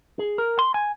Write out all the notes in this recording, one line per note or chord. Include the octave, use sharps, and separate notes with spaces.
G#4
A#4
C6
G#5